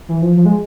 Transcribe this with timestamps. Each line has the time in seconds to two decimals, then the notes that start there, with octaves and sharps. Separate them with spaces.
0.08 E3
0.22 F3
0.37 F3
0.45 G#3